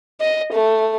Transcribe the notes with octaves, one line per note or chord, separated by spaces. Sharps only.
D#5
A3